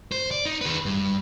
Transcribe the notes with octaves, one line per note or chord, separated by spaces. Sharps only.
C5
D5
D#4
G#4 B4
G2